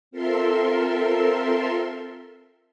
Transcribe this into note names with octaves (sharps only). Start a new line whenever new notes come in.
C4 F4 A4 A#4 E5 C6